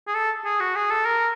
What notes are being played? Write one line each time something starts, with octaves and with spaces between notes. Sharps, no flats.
G#4
A4
G#4
F#4
G#4
A4
A#4